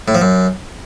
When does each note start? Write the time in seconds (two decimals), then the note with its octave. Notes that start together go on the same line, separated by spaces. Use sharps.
0.08 A2
0.15 F3
0.21 F#2